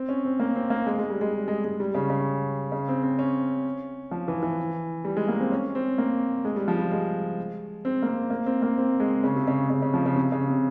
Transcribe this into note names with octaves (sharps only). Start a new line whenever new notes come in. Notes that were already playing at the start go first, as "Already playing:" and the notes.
Already playing: C4
C#4
C4
A#3
C4
A#3
G#3
G#3
G3
G#3
G3
G#3
G#3
G3
C#3
C#3
C#3
C4
C4
C#4
F3
E3
E3
G3
G#3
A#3
C4
C#4
C4
A#3
G#3
G3
F3
G3
G#3
C4
A#3
C4
A#3
C4
A#3
C4
G#3
C#3
C3
C#3
C#3
C#3
F3
C#3
C3
C#3
C3